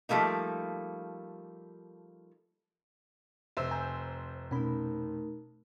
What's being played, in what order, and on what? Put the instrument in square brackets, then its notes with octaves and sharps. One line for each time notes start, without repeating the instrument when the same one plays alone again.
[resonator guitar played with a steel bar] F3 G3 A3 A#3 D#4
[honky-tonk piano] F1 C5 E6 [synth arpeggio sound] E5
[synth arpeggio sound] G#5 A#5 G6
[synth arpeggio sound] B2 C#4 B5 [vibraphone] A3 D#4 A#4